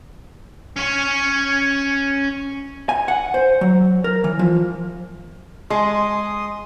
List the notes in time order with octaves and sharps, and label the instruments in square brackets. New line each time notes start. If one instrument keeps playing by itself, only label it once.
[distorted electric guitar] C#4 C#5
[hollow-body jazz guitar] G#5
F#5
C5
F#3
A#4
E3
F3
[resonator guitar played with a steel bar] G#3 [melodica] C6 D#6